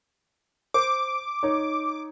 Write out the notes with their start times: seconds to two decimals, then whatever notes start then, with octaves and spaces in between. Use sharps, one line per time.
0.74 C5 D6
1.43 D#4 C#5